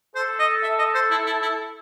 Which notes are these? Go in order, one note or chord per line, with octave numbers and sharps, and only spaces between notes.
A4 C5
D#5
E5
D#5
C5
E4
E4
E4